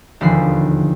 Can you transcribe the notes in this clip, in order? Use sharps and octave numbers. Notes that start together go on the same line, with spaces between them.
E1 D#2 D3 F3 B5 C7